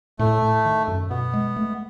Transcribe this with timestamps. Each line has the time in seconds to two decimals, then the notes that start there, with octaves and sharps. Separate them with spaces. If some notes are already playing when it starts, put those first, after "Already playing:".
0.19 A2 A3
0.42 A2
0.65 D#3
0.88 F#2
1.10 B2 B3
1.34 G#3
1.56 A3